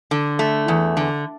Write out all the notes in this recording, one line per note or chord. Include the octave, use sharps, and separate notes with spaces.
D3
A3
E2
D3